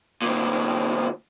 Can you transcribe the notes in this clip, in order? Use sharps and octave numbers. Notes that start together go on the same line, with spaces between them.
D2 A#2